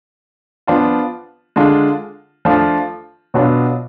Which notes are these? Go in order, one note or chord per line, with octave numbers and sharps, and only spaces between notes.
F3 B3 D4 F4
D3 G#3 D4 F4
F3 A3 D4 F4
B2 F#3 B3 D4 F4